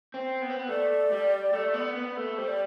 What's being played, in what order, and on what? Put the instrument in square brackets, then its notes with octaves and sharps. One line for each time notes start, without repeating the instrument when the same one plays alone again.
[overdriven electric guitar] C4
B3
C4
B3
[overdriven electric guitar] A3 [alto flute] D5
[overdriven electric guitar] G3
A3
B3
B3
A3
[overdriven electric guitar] G3 [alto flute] C5
[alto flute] D5